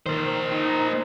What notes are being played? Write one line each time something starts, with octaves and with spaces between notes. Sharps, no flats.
D#3 A#3 C5
D#4